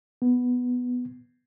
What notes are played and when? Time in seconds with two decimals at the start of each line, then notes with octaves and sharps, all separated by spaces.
0.22 B3